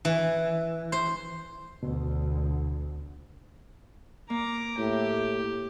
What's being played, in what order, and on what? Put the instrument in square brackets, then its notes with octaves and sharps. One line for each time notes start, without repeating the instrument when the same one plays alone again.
[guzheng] E3
C5
[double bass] D2 [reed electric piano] B2
[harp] A#3 [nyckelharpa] A#5 D6
[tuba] A2 [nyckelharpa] G4